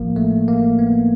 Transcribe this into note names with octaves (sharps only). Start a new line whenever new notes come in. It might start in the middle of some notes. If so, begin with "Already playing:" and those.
Already playing: A1 A2 F3 A#3
A3
A#3
B3